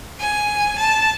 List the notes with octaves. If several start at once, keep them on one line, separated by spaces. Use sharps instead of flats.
G#5
A5